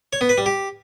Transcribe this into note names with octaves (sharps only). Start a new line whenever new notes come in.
C#5
B3
B4
G3
G4